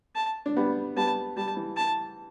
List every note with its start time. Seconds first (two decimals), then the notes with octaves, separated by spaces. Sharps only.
0.16 A5
0.46 D4
0.57 G3 B3
0.96 G3 B3 A5
1.36 G3 A5
1.57 E3
1.77 A5